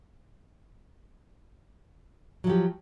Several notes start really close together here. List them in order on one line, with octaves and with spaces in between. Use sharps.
F#3 F3 G4